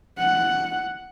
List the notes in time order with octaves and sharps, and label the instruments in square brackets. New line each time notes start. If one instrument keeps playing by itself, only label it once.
[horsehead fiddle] F#5